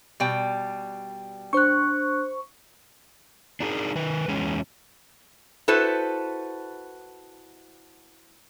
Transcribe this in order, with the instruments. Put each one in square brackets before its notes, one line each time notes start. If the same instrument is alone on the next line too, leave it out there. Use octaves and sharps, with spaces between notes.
[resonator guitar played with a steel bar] B2 G3 G5
[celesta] D4 F#6 [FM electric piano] C5 C#6
[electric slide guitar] D4 D#4 G#4 A#4
D#3 B4
E2 G#3 C#4
[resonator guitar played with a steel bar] E4 F#4 A4 B4 C5